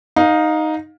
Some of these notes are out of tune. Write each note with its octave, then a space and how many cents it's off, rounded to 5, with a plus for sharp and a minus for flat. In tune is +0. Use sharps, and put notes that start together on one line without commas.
D#4 +0 F5 +25